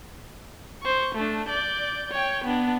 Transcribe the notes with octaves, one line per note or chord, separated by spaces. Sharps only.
C5 C#6
A3 D4
D5 G6
C#5 G5
B3 D4